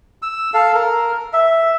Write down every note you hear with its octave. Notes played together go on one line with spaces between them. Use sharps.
E6
A4 F5
A#4
E5